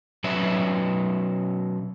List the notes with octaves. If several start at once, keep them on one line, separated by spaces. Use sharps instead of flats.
B2 F#3 C#4 B4 C#5 E5